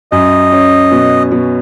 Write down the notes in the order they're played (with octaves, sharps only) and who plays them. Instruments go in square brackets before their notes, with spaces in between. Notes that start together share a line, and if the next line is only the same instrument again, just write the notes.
[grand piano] F#2 [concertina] D#5
[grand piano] C#4
B2
B2